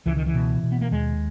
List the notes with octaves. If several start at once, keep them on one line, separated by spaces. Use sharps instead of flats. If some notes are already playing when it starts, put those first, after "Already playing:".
C#2 E3
D#3
E3
B2
B2
B3
A#3
D#2 G#3